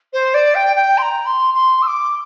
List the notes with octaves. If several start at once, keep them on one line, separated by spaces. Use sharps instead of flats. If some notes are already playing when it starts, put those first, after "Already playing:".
C5
D5
G5
G5
C6
A#5
C6
C6
E6
D6